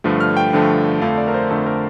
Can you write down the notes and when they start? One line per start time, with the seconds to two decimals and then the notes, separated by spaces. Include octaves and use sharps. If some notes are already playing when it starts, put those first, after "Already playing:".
0.04 G2 D3 F3 A3
0.21 F6
0.37 G5
0.53 G2 D3 F3 A3
1.02 F2 D3 A3 F5
1.18 D5
1.28 A#4
1.34 C5
1.50 F2 D3 A3 A4
1.66 A#4